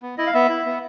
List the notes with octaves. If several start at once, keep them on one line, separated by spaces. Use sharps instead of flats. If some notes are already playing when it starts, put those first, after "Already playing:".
B3
E4 D#5
F5
B3 E5
E4
B3